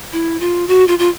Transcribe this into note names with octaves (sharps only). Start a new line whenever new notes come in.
E4
F4
F#4
F4
F4